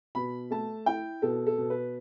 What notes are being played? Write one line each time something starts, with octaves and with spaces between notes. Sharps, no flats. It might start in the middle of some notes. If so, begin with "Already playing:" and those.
B2 B5
A3 A5
E4 G5
B2 A4
A4
B2
B4